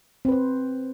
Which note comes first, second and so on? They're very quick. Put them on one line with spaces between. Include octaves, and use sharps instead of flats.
C4 B4 C5